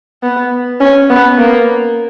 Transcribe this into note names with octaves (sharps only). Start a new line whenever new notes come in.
B3
C#4
B3
A#3